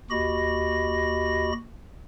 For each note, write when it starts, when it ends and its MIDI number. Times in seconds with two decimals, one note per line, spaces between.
0.10 1.52 39
0.10 1.52 66
0.10 1.52 67
0.10 1.52 75
0.10 1.52 83
0.10 1.52 94